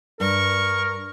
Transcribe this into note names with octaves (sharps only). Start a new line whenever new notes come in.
G2 A#4 C#6